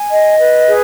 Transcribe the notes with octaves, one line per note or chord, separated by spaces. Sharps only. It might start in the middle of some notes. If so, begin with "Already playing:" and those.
Already playing: G#5
D#5
B4
G#4